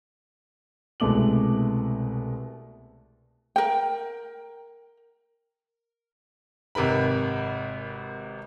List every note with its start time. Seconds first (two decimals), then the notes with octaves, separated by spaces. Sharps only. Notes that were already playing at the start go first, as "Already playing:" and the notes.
1.00 C2 B2 G#3 A3 D6 F#7
3.56 A#4 G5
6.75 G#1 C3 A#4 B4 B5